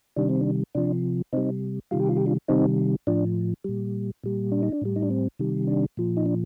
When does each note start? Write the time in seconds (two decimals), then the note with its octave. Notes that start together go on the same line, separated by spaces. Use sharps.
0.16 C3 D#3 G3 D4
0.29 C4
0.41 D4
0.75 C3 F3 D4
1.33 C3 G3 C4 D#4
1.91 C3 D#3 G3 F4
2.00 G4
2.09 F4
2.17 G4
2.26 D4 F4
2.48 C3 D#3 G3 C4 D#4
3.07 A2 F3 D4
3.64 A#2 G3
4.24 A#2 G3
4.52 D4
4.63 D#4
4.72 D4
4.82 A2 G3
4.96 D#4
5.02 D4
5.11 C4
5.39 C3 D#3 G3
5.67 D4
5.97 A#2 F3
6.17 D#4
6.26 D4